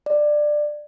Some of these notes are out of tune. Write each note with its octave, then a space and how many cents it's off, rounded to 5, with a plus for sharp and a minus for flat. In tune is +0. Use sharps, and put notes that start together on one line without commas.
D5 +15